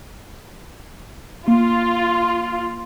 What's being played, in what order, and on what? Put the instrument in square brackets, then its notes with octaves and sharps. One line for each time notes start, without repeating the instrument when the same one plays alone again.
[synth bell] A#3 [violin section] F4